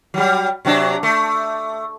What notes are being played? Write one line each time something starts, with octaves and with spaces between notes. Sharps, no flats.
F#3 G3
C3 F#3 D4
A3